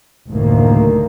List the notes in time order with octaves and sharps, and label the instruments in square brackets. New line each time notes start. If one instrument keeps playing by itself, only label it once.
[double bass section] F#1 D2 A2 D#3 A#3